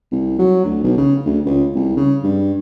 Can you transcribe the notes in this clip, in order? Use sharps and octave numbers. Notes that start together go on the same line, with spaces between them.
C2
F#3
D2
B1
C#3
D2
C#2
C2
C#3
G2